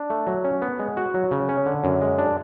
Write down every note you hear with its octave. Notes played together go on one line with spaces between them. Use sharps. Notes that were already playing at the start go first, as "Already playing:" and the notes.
Already playing: D4
A3
F#3
C#4
B3
G#3
F#4
F#3
C#3
C#4
D3
F#2
G#3
D4